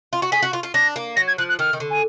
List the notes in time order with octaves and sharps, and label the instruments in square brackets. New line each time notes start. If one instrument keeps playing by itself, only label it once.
[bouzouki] F4
F#4
[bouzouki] G#4 [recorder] B6
[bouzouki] F#4
F4
F4
[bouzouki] D4 [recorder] A#6
[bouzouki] A#3
[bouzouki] F#3 [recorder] A#6
[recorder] G#6
[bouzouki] F3 [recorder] F#6
[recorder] F#6
[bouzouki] D#3 [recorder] F6
[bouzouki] D#3
D3
[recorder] G#5